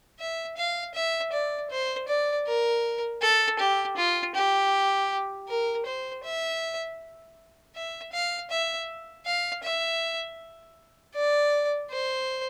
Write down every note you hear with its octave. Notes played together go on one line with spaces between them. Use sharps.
E5
F5
E5
D5
C5
D5
A#4
A4
G4
F4
G4
A#4
C5
E5
E5
F5
E5
F5
E5
D5
C5